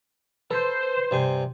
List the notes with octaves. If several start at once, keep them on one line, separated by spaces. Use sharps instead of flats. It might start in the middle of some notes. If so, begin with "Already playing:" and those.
A4 B4 C5
G2 C3 G#5